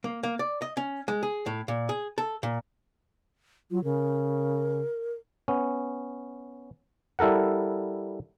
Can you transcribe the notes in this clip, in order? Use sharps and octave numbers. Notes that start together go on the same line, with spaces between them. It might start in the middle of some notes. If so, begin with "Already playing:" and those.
A#3
A#3
D5
D#5
C#4
G#3
G#4
A2
A#2
G#4
A4
A#2
F#3 F4
C#3 A#4
B3 C#4
G3 E4 A4 A#4 F#5